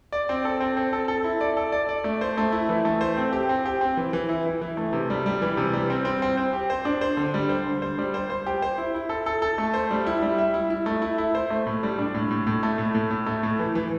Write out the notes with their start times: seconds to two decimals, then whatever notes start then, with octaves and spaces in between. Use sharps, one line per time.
0.12 D5
0.29 C4
0.45 A4
0.60 C4
0.77 C4
0.93 A4
1.08 A4
1.24 E4
1.41 D5
1.57 A4
1.72 D5
1.89 D5
2.04 A3
2.21 C5
2.37 A3
2.52 E4
2.69 E3
2.85 A3
3.01 C5
3.17 C4
3.33 G4
3.49 C4
3.66 G4
3.81 C4
3.97 E3
4.13 E3
4.29 E4
4.46 E4
4.61 E3
4.77 A3
4.93 C3
5.10 G3
5.26 G3
5.42 E3
5.57 C3
5.73 G3
5.90 C4
6.05 C4
6.22 C4
6.37 C4
6.53 G4
6.70 C5
6.85 D4
7.01 C5
7.17 D3
7.34 G3
7.49 C5
7.66 D3
7.82 C5
7.98 G3
8.14 C5
8.30 C5
8.46 G4
8.62 C5
8.78 E4
8.95 E4
9.09 A4
9.26 A4
9.42 A4
9.58 A3
9.74 C5
9.91 G3
10.06 E4
10.22 G3
10.38 E5
10.54 E4
10.70 E4
10.86 A3
11.02 E4
11.18 E4
11.35 C5
11.50 A3
11.66 A2
11.83 G3
11.99 D4
12.14 A2
12.31 A2
12.47 A2
12.63 A3
12.78 A2
12.95 A2
13.10 A2
13.26 A3
13.43 A2
13.59 E3
13.75 E3